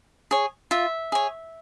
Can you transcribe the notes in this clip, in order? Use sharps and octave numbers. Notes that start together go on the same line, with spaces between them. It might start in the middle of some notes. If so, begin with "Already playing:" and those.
G#4 C#5
F4 E5
G#4 C#5